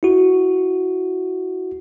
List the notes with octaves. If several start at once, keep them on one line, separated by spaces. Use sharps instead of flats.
E4 F#4